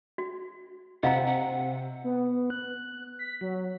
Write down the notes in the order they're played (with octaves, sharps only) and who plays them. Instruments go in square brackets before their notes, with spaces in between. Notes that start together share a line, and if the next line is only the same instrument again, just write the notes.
[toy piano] F#4
[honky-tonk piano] C3 [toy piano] D#5 F5 A#5 [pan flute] F#5
[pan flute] F#5
[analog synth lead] B3
F#6
B6
F#3